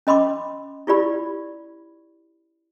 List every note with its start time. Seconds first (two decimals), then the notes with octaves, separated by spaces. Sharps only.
0.07 C#4 D#5 B5 C6 D6
0.87 E4 F4 G4 D5 B5